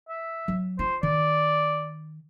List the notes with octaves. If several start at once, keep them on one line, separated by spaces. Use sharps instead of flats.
E5
F#3
F4 C5
D#3 D5